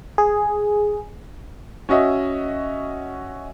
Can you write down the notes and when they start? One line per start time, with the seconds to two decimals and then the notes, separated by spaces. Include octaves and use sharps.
0.18 G#4
1.89 C#4 F#4 D#5 E5